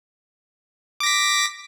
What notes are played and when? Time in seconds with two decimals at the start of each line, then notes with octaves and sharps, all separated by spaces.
1.00 D6
1.03 A#6
1.06 B6